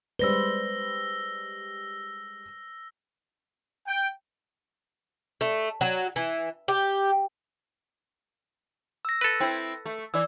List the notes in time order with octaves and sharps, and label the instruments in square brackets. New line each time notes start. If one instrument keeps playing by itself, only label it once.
[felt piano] G3 G#3 D5 [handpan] B4 C5 [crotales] E6 A#6 G7
[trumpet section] G5
[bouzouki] A3
F#3
E3
G4
[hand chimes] E6 A#6
[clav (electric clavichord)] A4 B4
[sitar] C4 E4
A3
[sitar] E3 [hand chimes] D5 E6